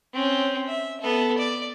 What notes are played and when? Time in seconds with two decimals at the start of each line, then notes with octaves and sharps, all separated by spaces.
0.13 C4 C#4
0.67 E5
1.01 B3 A4
1.38 D5